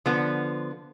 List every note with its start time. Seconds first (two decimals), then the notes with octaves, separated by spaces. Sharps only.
0.06 D3 F3 B3